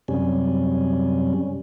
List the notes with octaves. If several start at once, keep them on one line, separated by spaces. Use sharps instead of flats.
F#2 C3 G3 C#4